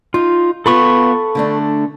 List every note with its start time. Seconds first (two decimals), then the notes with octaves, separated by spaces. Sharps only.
0.14 D#4 F4
0.66 B3 F4 A4 B5 C#6
1.35 D3 A3 D4